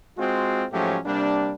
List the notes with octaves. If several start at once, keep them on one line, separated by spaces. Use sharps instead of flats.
G#3 C4 F4 F#4
G#2 F3 F#3 A3 C#4 G4
C3 G3 A#3 D4